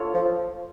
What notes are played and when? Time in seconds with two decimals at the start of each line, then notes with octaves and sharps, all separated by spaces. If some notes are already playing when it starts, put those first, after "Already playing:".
Already playing: F4 A4 C#5
0.14 F3